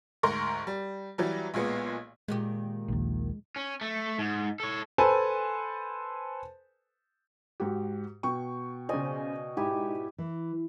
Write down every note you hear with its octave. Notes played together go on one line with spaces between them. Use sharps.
D2 G#2 A#4 C6 C#6 A#6
G3
E3 F#3 G3
B1 A#2 G#3 B3
A#2 D#3 G#3 G4
A#1 D#2
C#4
A3
G#2
A4 C#5
A4 B4 C5 G#5 A5
G#2 F#4 G4
B2 G5 C#6
C#3 C5 D5 D#5 G#5
G#2 D#4 E4 G4 G#5
E3